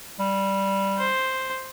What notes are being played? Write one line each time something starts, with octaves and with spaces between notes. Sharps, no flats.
G3
C5